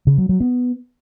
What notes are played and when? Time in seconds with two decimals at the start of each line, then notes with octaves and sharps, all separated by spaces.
0.07 C#3
0.18 F#3
0.29 F#3
0.40 B3